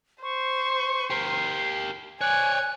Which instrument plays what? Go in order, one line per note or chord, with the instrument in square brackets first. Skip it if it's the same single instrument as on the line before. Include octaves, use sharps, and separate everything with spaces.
[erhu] C5 [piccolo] C#6
[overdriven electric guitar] G4 A#4 [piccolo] C7
[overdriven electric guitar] C#5 D5 [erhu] G#5 [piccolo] F#6